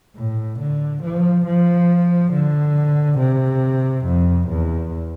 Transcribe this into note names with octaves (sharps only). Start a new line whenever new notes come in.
A2
D3
F3
F3
D3
C3
F2
E2